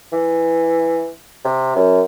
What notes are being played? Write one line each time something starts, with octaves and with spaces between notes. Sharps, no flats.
E3
C3
F#2